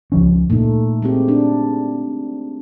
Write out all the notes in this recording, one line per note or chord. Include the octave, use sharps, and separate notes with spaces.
C#2 F3 C#4
A#2 A3 D#4
G#3 C4 G4
D4